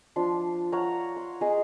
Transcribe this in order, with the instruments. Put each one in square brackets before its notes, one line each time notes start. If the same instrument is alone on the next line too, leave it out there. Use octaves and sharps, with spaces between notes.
[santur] F3 D4 C6
C#5 F5 F#5 A#5
C6
G#4 D#5 C6 D6